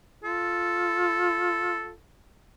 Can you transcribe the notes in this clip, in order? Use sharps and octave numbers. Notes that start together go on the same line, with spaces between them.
F4 A4